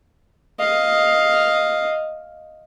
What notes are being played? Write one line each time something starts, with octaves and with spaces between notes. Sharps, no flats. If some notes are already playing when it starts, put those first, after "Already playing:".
D#5 F5